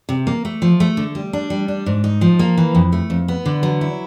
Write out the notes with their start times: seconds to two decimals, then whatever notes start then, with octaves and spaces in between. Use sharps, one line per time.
0.09 C3
0.27 A#3
0.45 A3
0.62 F3
0.80 A3
0.97 D3
1.15 G3
1.33 D4
1.50 G3
1.68 D4
1.86 G#2
2.04 D#4
2.21 F3
2.39 A#3
2.58 E3
2.75 F2
2.92 A3
3.10 F2
3.28 B3
3.46 D3
3.63 F#3
3.81 E4